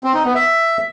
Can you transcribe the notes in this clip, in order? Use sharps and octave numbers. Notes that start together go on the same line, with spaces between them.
C4
D#4
B3
E5